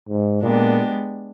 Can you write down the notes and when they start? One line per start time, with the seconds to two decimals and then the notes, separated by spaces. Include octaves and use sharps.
0.09 G#2
0.42 A#2 G#3 B3 D4 G4